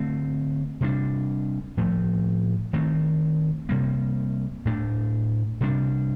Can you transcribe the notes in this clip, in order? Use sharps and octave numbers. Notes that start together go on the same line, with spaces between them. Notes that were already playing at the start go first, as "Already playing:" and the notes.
Already playing: D3 A3 C4
C3 G3 D4
A2 F3 A3
D#3 A3 C4
C3 G3 A#3
A2 A3 D4
C3 G3 D4